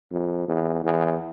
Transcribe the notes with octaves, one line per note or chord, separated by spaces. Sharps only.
F2
E2
E2